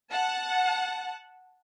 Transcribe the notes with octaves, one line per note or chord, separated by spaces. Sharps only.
F#5 A5